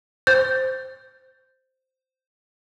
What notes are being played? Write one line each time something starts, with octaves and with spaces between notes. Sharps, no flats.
C5 G6